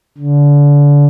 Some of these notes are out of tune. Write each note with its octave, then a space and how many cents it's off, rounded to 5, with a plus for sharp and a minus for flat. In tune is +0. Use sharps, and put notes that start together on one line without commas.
D3 -30